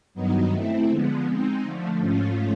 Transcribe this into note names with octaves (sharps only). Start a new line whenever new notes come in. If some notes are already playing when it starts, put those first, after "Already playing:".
G2 D#3 F#3 B3 D#4
A3 C4 E4
D3 F3 G#3 B3
G#3 C4 D#4
D3 F3 A3
G#2 F3 A3 C#4 F4